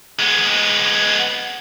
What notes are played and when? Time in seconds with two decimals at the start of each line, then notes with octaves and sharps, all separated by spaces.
0.20 G#3 B3